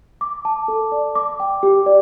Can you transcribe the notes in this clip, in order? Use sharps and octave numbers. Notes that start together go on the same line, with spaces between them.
D6
A5
A4
D5
D6
G5
G4
D5